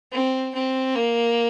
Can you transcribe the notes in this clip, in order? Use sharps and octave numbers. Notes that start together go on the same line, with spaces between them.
C4
C4
A#3